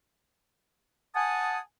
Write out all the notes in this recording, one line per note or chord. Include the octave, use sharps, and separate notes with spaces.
F#5 G#5 A5 D#6